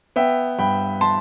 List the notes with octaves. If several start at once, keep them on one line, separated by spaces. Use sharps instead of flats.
B3 E5 G5
G2 G5 B5
A5 C6